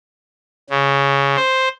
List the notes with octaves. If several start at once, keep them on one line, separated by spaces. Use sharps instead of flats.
C#3
C5